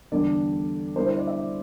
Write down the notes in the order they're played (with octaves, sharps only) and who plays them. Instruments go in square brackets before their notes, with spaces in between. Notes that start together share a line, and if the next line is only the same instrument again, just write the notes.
[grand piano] E2 D3 G3 D4 D5
D3 G3 E4 C5
C5
D5
E5
D5